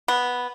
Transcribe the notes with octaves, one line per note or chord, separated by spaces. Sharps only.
B3